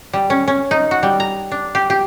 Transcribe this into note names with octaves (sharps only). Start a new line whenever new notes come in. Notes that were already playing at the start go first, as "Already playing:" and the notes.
G3
C#4
C#4
D#4
F#4
G3
A#5
D4
G4
G4